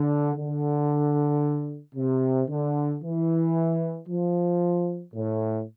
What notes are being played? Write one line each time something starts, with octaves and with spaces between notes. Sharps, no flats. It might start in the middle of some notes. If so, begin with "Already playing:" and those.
Already playing: D3
D3
C3
D3
E3
F3
A2